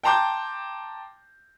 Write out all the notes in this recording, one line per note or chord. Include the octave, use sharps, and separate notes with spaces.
G5 A5 A#5 C6 D6 G6